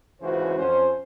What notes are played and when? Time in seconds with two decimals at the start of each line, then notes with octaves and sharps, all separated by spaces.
0.21 G#1 C#2 C#3 E3 F#4 C5
0.57 F2 C#4 C5